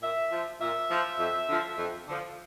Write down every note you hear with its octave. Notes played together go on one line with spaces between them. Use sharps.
A#2 E5
F3
A#2 E5
F3
F2
D3 F3
F2
D3 F3